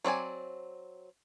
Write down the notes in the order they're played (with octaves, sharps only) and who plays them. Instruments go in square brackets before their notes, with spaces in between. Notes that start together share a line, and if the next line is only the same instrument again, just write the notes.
[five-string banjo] F#3 C4 D5 G#5